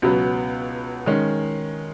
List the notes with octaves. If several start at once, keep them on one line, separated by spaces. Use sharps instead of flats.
C#2 B2 F#3 B3
D#3 G#3 C#4